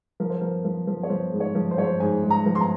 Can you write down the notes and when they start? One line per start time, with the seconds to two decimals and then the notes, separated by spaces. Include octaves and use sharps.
0.20 F3 A#4
0.30 C5
0.41 F3 A#4
0.65 F3
0.87 F3
1.03 C#5
1.09 F3 C5
1.32 G#2
1.40 C#5
1.55 F3
1.71 C5
1.77 F3 C#5
1.84 C5
2.00 G#2 G#5
2.23 G#2
2.30 A#5
2.46 F3
2.55 C6
2.60 A#5